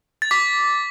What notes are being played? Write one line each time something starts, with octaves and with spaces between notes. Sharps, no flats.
A6
D6 B6